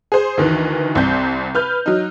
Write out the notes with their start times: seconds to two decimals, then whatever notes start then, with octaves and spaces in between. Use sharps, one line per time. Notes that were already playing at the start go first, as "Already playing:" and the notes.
0.12 G#4 C5
0.37 D2 D#3 E3
0.95 C2 C3 C4 G6
1.55 B4 F6 G6
1.86 F#3 D#4